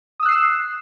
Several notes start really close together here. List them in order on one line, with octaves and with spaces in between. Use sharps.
D#6 E6 F#6 C7 E7